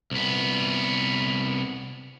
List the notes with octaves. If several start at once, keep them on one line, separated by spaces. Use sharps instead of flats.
C2 B3